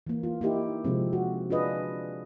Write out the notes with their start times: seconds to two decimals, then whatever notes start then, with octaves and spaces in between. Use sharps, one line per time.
0.07 E3 A#3
0.23 F4
0.41 A#3 D#4 E4 G4 A#4
0.85 C3 F3 G#3 C4
1.13 F#4
1.50 D4 F4 G#4 B4 D#5